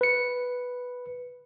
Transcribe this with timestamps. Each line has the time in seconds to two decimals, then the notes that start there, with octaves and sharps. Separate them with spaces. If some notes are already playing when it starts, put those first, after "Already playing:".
0.01 B4 C#7